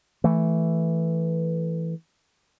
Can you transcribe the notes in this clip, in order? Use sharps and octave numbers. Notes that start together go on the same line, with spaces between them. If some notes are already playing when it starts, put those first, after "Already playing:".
E3 A3